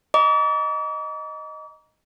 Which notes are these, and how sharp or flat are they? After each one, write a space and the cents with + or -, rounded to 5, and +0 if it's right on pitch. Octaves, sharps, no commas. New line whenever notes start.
D#5 +0 A#5 +20 D6 -40